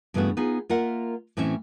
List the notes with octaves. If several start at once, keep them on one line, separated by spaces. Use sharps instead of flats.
G2 C#3 E3 A3 B3 F#4
B3 D#4 F4 G#4
A#3 F4 A#4 E5 F#5
A2 E3 C4 C#4 E5